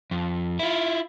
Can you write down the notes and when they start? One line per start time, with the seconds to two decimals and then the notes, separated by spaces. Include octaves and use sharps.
0.11 F2
0.59 E4 F4